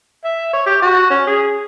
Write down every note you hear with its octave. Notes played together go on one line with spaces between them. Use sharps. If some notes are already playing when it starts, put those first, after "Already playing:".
E5
C#5
G4
F#4
C#4
G#4